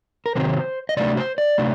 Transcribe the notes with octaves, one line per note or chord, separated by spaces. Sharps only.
A#4
C3 D#3 F#3 C4 C5
D#5
C3 F#3 A3 D4 D5
C5
D5
C3 F#3 A3 D4